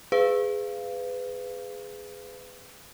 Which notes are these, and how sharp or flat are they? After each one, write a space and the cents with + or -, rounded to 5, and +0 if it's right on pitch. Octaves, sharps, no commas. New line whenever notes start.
G#4 +0 B4 +25 F5 -15